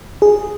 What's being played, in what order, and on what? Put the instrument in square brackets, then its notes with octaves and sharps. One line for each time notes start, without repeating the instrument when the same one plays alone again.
[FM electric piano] G#4